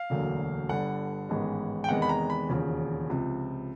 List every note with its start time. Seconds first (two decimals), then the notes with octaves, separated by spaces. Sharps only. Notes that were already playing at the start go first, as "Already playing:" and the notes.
Already playing: F5
0.10 E1 D2 D3 F#3 A#3
0.69 G1 G2 D3 F#5
1.29 A1 G#2 D#3 G#3 B3
1.84 G5
1.89 E2 C3 D#3 G#3 B3 F#5
2.02 B5
2.09 A#5
2.30 B5
2.49 E1 D#2 C#3 F3
3.10 C#2 C3 F3